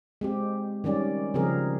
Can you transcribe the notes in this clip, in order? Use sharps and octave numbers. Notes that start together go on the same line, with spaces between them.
G#3 C4 G4
D#3 G3 C#4 D5
C#3 F3 C4 G#4 A#4